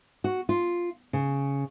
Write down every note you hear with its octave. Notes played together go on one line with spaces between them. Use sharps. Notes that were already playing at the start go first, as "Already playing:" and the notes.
F#4
F4
C#3